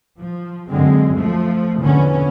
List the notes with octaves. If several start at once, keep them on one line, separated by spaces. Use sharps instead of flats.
F3
F#2 D3 G#3 C4
F3 A3
A#1 E2 D3 E3 B3 C#4